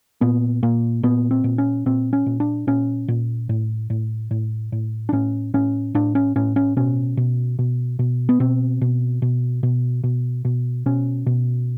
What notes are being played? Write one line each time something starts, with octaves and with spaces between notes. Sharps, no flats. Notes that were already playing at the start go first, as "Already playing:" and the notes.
A#2 B3
A#2 A#3
A#2 B3
C4
A#2
C#4
A#2 C4
C#4
A#2
D4
A#2 C#4
A#2
A2
A2
A2
A2
D4
A2 C#4
A2 C#4
A2 D4
C#4
A2 C#4
C#4
B2 C#4
B2
B2
B2
B3
B2 C4
B2
B2
B2
B2
B2
B2 C#4
B2